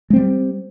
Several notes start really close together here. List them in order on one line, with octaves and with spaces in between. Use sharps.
G#3 C4 G3